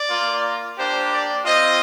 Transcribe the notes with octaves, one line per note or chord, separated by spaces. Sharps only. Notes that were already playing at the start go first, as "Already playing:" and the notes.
Already playing: D5
A#3 F4
A#3 D4 G4 C5
D5
C4 F4 D#5